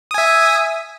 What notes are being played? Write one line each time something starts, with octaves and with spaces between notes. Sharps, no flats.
E5 G#5 D#6